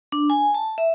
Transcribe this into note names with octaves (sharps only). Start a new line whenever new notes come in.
D4
G#5
A5
E5